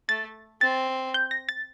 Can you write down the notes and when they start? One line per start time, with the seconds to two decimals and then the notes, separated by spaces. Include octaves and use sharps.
0.09 A3 A6
0.61 C4 A6
1.14 G6
1.31 A#6
1.49 A6